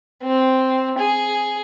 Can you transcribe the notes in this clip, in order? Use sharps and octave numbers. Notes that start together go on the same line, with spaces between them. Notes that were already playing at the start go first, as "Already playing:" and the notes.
C4
G#4